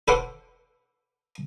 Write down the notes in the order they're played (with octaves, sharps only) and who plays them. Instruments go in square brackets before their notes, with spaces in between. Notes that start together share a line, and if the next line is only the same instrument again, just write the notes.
[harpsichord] A4 B4 C5 F#5 D6